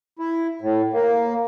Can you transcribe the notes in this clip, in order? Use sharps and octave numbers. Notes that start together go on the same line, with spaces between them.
E4
A2
A#3